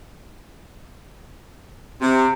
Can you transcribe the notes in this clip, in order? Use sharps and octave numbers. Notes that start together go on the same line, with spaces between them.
C3